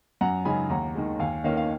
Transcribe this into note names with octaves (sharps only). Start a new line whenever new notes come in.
F#2 F#5 A#5
C#3 G#3 D#4 G#5 B5
D#2 F#5 A#5
D#3 G#3
D#2 F5 G#5
D#3 A#3 C#4 C#5 F5
F5